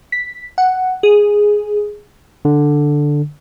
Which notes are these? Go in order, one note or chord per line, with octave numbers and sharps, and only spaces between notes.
B6
F#5
G#4
D3